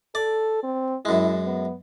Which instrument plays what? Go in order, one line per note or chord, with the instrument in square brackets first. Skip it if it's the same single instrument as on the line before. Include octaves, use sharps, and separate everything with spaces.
[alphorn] A4 [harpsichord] D5
[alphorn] C4
[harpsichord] F#2 G#3 [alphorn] E4
[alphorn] B3